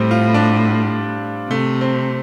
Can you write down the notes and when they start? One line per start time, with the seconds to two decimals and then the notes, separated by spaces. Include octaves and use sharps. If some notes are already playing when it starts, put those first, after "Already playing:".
Already playing: A2 G3 C4
0.11 F4
0.34 D4
1.50 C3 A3
1.81 C4